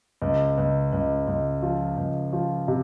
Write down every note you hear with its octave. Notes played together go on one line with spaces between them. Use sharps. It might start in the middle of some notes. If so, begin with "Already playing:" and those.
C#2
C#2
C#2
C#2
F3
C#2
F3
C3